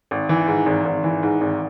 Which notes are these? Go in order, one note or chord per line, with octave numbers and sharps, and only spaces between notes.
G#1
E3
G#2
G#1
G#1
E3
G#2
G#1